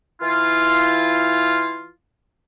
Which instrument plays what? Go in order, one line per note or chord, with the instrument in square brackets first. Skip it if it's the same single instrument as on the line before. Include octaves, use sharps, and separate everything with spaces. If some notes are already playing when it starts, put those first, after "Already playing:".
[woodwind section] E3 E4 F4